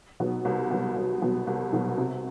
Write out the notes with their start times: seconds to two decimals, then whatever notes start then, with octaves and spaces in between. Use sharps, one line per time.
0.20 B2 F#3 B3
0.45 C2
0.71 B2 F#3 B3
0.96 C2
1.22 B2 F#3 B3
1.47 C2
1.73 B2 F#3 B3
1.97 C3